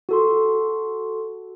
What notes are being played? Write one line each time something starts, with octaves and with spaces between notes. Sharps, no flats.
F#4 A4 C6